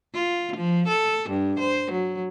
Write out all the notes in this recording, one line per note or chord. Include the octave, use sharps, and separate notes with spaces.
F4
F3
A4
G2
C5
F#3